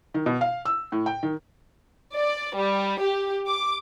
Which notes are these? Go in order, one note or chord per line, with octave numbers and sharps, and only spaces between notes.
D#3
B2
F5
E6
A2
G5
D#3
D5
G3
G4
D6